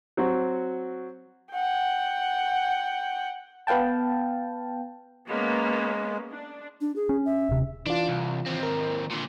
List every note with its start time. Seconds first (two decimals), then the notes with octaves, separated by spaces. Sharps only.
0.17 F#3 C4 F#4
1.53 F#5 G5
3.67 B3 B4 F5 G5 A5
5.29 G#3 A#3 B3 C#4
6.31 D4
6.81 D4
6.96 G#4
7.09 C#4
7.26 E5
7.49 D#1 C3
7.86 E3 D4 F4
8.08 C2
8.46 D#2 C4
8.63 A#4
9.10 A#2 D3